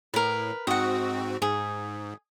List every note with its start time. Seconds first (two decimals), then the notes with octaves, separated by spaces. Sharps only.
0.14 A2 A#4 B4
0.67 G#2 C4 F#4 D#5 F#5
1.42 G#2 G#4